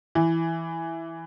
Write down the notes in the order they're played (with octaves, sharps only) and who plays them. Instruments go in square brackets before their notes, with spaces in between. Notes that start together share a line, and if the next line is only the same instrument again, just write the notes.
[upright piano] E3